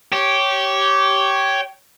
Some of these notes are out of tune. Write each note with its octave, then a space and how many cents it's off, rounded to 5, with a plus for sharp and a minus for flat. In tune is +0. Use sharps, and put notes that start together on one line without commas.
G4 -15 C#5 +0